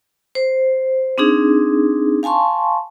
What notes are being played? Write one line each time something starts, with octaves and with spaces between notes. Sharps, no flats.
C5
C4 D4 D#4 G#4
F5 G#5 A5 C6 C#6